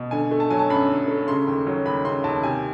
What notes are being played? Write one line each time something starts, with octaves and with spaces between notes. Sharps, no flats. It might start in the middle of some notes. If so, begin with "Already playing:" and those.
Already playing: B2
D3 G#5
A3
A5
F#3 G#5
A5
F#2 B5
D3
A3
C#3 C6
D#2
F#3
D#2 B5
C#3 C6
D#2 A5
C3 G#5